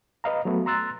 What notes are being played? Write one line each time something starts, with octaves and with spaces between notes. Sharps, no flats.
B4 D#5 F5 A#5
F#3 A3 B3
A#5 C6 E6 F#6 A6